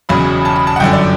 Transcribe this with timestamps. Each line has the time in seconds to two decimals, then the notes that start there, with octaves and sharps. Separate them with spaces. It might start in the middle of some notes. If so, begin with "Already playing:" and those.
0.09 E1 E2 C#3 F#3 B5
0.45 A5
0.56 B5
0.67 A5
0.76 F#5
0.80 G1 F#2 D3 G5
0.93 D5